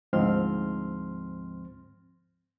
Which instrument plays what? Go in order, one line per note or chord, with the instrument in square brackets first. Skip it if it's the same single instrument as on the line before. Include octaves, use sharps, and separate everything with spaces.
[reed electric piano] D2 G#2 F3 C4 C6 F6